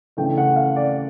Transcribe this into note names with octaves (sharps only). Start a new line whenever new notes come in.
C#3 E3 A3 D4 G5
F#5
F5
D5